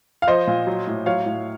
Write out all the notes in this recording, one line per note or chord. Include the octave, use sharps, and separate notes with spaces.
F5
F3 C5 D#5
A#2
F#3
A2
F#3 C#5 F5
A2